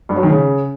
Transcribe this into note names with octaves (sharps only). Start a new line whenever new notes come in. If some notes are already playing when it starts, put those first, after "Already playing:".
G2
F#3
D#3
C#3